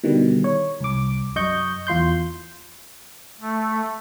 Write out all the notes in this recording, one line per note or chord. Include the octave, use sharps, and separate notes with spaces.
B2 D3 D#3 G3
C#5
C2 D6
F#2 D#5 C#6 G6
E2 F4 C6 G6
A3